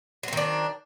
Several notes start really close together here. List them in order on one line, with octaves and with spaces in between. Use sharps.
F#3 C4 D#3 D4